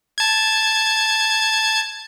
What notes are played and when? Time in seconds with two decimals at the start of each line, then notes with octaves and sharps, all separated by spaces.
0.18 A5 G#6